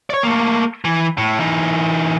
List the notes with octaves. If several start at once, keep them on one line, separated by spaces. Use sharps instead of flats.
C#5 D5
A3 A#3
E3
A2
E3 D#4